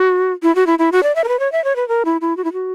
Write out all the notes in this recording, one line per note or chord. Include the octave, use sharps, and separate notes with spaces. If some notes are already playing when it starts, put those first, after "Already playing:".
Already playing: F#4
E4
F#4
E4
E4
F#4
D5
E5
A#4
B4
C#5
E5
C#5
B4
A#4
E4
E4
F#4
E4
F#4